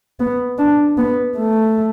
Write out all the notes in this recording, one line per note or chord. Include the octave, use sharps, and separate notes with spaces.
B3
D4
B3
A3